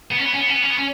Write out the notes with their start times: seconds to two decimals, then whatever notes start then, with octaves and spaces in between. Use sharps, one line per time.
0.11 B3
0.18 C#4
0.25 B3
0.34 C#4
0.40 B3
0.48 C#4
0.55 B3
0.62 C#4
0.70 B3
0.78 C#4